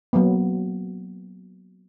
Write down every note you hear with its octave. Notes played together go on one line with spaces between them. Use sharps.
F#3 A#3 B3